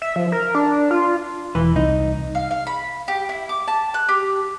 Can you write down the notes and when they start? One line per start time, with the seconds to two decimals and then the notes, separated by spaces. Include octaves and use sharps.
0.02 E5
0.16 F3
0.32 A#4
0.55 D4
0.91 F4
1.55 E1 E3 B4
1.76 C2 D#4
2.35 F5
2.51 F5
2.67 B5
3.08 G4
3.29 E4
3.49 D6
3.68 A5
3.94 F#6
4.09 G4